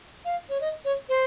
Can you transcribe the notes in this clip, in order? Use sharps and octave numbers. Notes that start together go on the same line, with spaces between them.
F5
C#5
D#5
C#5
C5